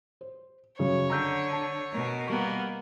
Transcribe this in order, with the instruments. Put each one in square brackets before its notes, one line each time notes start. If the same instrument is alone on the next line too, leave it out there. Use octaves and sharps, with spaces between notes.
[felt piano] C5
[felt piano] F#2 C#3 [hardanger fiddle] C#5
[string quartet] D3 [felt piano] A#5 E6 G6
[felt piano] A5
[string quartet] B2 A#4
[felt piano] G3 C#6 [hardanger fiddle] A#3 B3